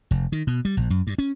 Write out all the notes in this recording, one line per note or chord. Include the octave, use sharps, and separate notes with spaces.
F1
D#3
B2
G3
A#1
F#2
G2
C#4